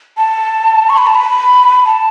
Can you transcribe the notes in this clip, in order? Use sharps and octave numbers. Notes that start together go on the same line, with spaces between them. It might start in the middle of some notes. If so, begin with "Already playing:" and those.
A5
C#6
B5
A5
B5
A5